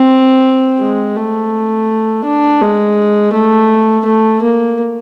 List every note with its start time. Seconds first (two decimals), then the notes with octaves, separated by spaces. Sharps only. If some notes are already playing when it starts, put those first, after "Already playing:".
Already playing: C4
0.80 G#3
1.16 A3
2.25 D4
2.61 G#3
3.33 A3
4.05 A3
4.42 A#3